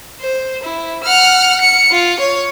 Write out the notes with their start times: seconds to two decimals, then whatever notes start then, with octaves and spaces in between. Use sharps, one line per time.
0.20 C5
0.63 E4
1.04 F#5 F6
1.61 C#7
1.91 F4
2.20 C#5